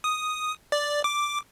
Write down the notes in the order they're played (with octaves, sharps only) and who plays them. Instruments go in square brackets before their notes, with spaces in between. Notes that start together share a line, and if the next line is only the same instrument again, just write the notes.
[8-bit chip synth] D#6
D5
D6